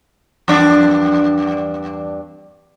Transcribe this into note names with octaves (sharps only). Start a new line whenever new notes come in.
E2 G2 D4